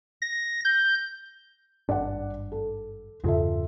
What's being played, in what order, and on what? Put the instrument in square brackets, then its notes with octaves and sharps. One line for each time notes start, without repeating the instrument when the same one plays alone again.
[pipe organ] A#6
G6
[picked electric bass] G#1 G2 D4 [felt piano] D5 F#5
[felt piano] A4
[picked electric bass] E2 G2 C#3 [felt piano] F4 A4 E5